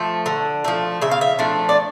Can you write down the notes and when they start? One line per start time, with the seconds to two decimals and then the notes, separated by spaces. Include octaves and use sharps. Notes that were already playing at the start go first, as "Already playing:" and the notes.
Already playing: F3 A3
0.26 D3
0.64 F3 A3
1.01 C#3 E5
1.11 F5
1.21 E5
1.39 F3 A3 D4
1.69 D5